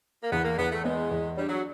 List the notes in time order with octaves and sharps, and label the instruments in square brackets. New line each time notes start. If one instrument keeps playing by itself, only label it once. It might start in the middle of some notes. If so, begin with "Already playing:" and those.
[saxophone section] A#3
[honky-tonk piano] E2 [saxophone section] B3
[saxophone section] A#3
[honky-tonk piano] E2 [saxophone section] B3
[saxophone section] A3
[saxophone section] G#3 [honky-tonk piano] B3
[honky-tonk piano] E2
[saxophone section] G3 [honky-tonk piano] D4
[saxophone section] F#3